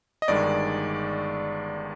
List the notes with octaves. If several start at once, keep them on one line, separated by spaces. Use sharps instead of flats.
D#5
G1 G2 D#3 G#3 D5